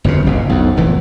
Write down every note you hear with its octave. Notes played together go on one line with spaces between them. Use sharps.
G1 F2 A#2 C#3
F1 A#1 B2
B1 F2
F1 E2 A#2 E3